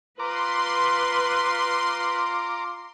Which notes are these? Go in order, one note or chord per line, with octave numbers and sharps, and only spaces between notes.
F4 B4 A#5 C6 D6